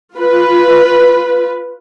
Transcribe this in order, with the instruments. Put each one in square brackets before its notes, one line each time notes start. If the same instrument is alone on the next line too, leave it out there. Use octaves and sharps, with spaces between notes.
[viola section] F4 B4